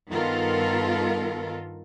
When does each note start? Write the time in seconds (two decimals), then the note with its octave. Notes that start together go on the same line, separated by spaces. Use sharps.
0.10 G2 D#3 B3 F4 A4 A#4